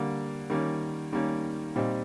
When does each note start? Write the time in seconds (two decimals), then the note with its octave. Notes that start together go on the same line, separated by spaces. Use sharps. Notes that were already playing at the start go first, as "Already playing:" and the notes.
Already playing: D3 G3 A#3
0.50 D#3 G3 A#3 C#4
1.13 D#3 G3 A#3 C#4
1.76 A#2 G3 C4 D#4